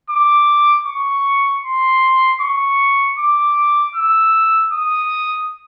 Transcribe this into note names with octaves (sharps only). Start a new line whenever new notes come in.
D6
C#6
C6
C#6
D6
E6
D#6